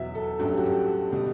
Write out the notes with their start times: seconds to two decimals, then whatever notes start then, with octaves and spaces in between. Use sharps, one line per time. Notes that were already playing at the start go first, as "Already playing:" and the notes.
Already playing: E2 B2 F#3 E5
0.15 A4
0.39 A1 G2 F#3 A4
0.48 G4
0.58 F#4
0.66 G4
1.13 B2 G3